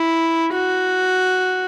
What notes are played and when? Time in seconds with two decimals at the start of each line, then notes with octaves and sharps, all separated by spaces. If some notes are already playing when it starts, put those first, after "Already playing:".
Already playing: E4
0.53 F#4